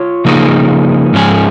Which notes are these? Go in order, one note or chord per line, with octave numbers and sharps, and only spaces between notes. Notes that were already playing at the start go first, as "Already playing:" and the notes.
Already playing: F4 C#5
C#3 F3 A#3 D#4 G#4
G#2 F3 C#4 G#4